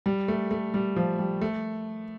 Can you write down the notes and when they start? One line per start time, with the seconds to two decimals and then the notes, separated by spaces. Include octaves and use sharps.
0.06 G3
0.28 A3
0.51 A3
0.74 G3
0.96 F3
1.19 G3
1.41 A3